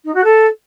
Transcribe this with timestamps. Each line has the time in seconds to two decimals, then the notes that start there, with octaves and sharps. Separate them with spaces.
0.04 D#4
0.14 F#4
0.24 A4